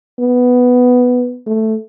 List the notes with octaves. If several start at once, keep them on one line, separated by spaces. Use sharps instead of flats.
B3
A3